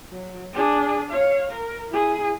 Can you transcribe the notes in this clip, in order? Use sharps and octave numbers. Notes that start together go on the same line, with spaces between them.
F#3
D4 G#4
C#5 F5
A#4
E4 G#4